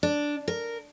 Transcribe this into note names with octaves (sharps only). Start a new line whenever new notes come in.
D4
A#4